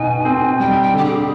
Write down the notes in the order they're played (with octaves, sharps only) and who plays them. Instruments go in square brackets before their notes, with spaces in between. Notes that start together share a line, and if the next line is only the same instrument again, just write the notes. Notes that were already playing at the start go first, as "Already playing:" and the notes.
Already playing: [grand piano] B2 D#4 [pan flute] G#5
[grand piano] C4
[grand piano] G3 [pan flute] G5
[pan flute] G5
[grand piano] D3 [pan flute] G4
[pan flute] G#4